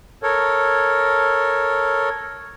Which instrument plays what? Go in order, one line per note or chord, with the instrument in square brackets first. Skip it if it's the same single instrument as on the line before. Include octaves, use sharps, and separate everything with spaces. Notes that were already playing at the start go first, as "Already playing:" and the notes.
[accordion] A4 A#4 C#5